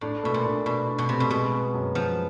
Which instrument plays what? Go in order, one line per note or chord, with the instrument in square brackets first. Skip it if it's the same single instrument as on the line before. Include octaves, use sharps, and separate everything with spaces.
[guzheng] A2 [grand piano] D4
[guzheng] B2 [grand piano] A3
[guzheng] A#2
[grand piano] D4
[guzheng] B2 [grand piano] D4
[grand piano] D4
[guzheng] B2
[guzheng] C3 [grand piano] A3
[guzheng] B2
[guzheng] B2 [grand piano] G#3
[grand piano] B3
F#2
[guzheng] F3 [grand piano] B3